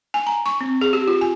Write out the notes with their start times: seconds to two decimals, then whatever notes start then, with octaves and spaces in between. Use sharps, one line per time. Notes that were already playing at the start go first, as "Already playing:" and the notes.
0.14 G#5
0.27 A#5
0.46 C#6
0.61 C4
0.81 G#4
0.93 G4
1.08 F4
1.21 G#5